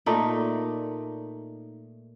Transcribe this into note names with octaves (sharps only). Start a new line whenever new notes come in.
A#2 A3 D#4 D5